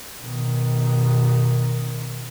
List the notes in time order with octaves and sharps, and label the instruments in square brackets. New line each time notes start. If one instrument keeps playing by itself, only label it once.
[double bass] B2 D#3